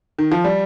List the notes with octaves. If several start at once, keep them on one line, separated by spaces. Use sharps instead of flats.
D#3
F3
G3